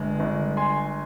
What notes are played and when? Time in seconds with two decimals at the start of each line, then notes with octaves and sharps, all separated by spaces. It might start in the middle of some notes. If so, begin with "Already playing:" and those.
Already playing: G1 G#3
0.20 G1
0.57 G#5 C6